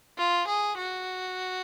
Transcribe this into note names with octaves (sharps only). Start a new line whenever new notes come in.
F4
G#4
F#4